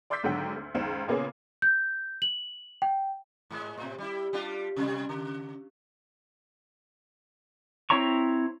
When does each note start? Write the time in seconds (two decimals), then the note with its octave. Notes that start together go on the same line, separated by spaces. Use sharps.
0.10 D5 C6 D6 E6 G6 B6
0.23 G#1 G#2 D3 F#3 F#5 G5
0.56 D2
0.75 F#1 C#2 D#3 C5 E7
1.07 A#2 C#3 A#3 B3 C#4 G#4
1.62 G6
2.22 F#7
2.82 G5
3.50 G#2 G#3
3.78 A2 C3
3.98 G3 E4
4.33 G3 D4 F4
4.76 C3 G3
5.09 C#3
7.90 C4 E4 C#5 A#5 C#6